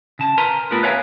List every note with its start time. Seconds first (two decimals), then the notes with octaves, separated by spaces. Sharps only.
0.19 C#3 A5
0.38 A#4 B4 G#5 A#5 C6
0.71 G3 A3 B3 F4 A#4 B4
0.83 B4 C#5 E5 F5 G#5